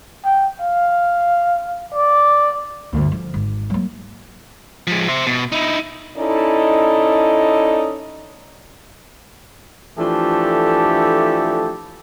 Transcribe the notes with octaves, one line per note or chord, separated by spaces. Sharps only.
G5
F5
D5
G1 D2
D3 F3
G#1
F#3 A#3
F3 G#3
C5 E5
B2
D#4 E4
C#4 D#4 E4 A4 D5 D#5
E3 F3 A3 D4 G4 A4